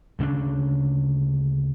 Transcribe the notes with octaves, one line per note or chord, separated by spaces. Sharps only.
D2 C#3 B3 D4